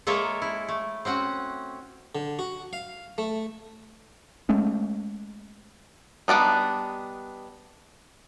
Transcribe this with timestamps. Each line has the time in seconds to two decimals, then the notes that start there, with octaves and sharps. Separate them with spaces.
0.07 G#3 A#3 A4 A#4 C#5 E5
0.42 E4
0.68 A3
1.05 C4 C#4 F#4 F#5
2.15 D3
2.39 F#4
2.73 F5
3.18 A3
4.49 G#3 A3 C#4
6.28 G3 B3 D4 D#4